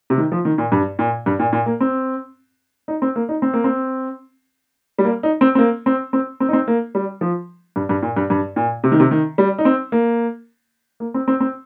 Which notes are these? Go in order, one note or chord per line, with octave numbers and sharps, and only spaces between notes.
C3
D#3
F3
D#3
A#2
G2
A#2
G2
A#2
A#2
A#3
C4
D#4
C4
A#3
D#4
C4
A#3
C4
G3
A#3
D#4
C4
C4
A#3
C4
C4
C4
D#4
C4
A#3
G3
F3
G2
G2
A#2
G2
G2
A#2
C3
D#3
C3
D#3
G3
D#4
C4
A#3
A#3
C4
C4
C4